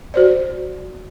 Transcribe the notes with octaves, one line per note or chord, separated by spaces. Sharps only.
F#4 C5 D5